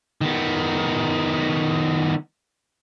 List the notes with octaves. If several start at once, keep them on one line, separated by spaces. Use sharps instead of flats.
D#3 B3